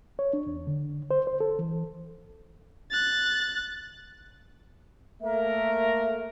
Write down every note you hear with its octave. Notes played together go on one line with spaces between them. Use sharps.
C#5
D4
E2
D3
C5
C5
A4
E3
F#6 A6
A3 A#3 A#4 E5